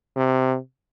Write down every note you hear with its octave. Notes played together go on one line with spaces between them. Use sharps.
C3